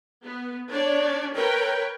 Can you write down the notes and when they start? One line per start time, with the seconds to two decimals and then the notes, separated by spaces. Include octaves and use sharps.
0.23 B3
0.70 D4 C#5 D5
1.35 A#4 B4 C#5 G5